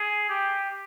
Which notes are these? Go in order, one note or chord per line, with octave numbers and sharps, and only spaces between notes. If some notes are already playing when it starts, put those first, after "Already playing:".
Already playing: G#4
G4